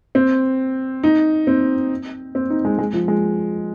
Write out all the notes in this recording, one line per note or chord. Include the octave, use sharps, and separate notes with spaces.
C4
D#4
C4
C4
D#4
G#3
G#3
F3
G#3